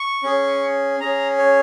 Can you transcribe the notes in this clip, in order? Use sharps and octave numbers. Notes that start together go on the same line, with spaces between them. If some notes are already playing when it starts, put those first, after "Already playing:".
Already playing: C#6
C#4 G#4
C#4 G#4 A#5
C#5